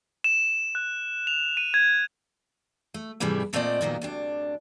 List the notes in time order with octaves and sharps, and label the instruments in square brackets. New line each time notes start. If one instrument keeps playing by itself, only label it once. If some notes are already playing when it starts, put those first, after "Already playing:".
[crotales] E7
F#6
F7
D#7
G#6
[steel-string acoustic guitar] A3
F2 G#2 C3 E3 G3 A3
A#2 A3 C4 F4 D5 D#5
F2 A#2 D#3 F#3 B3
D2 C3 D4